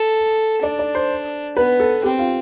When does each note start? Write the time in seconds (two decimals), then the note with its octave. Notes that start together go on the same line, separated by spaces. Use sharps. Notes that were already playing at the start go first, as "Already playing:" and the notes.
Already playing: A4
0.63 D4 D5
0.79 D5
0.95 C5
1.57 B3 B4
1.80 A4
2.03 C4 G4
2.19 F4